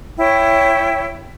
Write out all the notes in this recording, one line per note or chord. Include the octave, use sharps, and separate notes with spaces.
E4 C#5 G5